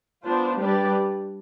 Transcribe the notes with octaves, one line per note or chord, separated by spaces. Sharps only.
B3 D4 F4 C5
G3 D4 G4 B4 D5